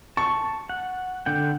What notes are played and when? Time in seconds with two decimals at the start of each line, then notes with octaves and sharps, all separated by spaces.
0.17 A5 C#6
0.69 F#5
1.26 D3 F#5 G5